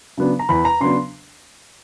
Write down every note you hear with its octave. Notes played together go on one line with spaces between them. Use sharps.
C#3 F#3 B3 D4
A#5
E2 B5
A#5
C#3 F#3 B3 D4 C6